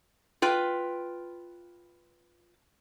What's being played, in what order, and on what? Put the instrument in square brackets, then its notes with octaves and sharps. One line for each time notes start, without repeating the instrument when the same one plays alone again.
[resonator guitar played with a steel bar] F4 B4 G5